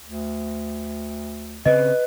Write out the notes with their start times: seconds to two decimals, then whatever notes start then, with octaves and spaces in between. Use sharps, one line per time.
0.03 D2
1.66 C#3 C4 C#4 B4 D#5